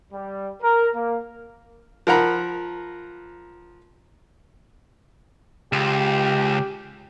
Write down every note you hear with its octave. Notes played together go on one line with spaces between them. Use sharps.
G3
A#4
A#3
F3 A#4 F#5 A#5 B5
C#2 G4